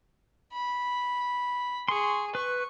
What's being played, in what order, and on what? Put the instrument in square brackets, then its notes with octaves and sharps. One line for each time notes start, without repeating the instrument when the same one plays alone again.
[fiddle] B5
[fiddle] G#4 [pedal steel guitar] C6 C#6
[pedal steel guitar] B4 [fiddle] C#6